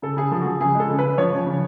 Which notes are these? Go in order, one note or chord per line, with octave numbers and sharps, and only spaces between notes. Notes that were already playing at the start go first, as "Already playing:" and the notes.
C#3 A4
C#3 G#4
F3 A4
F#4
F3 G#4
C#3 G#4
G#3 A4
C#3
B4
C#3
F3 C#5
F3
C#3